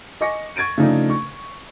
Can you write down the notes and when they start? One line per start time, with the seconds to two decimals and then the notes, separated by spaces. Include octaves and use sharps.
0.21 D#5 G#5 C#6 D6 A#6 C#7
0.56 C#6 G#6 A6 D7 D#7
0.78 C#3 F3 A3 D4 D#4
1.10 C#6